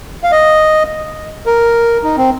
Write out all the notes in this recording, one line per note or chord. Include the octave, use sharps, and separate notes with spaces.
F5
D#5
A#4
D#4
C4